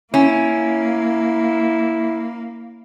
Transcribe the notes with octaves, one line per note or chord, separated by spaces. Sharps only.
A#3 C#4 E4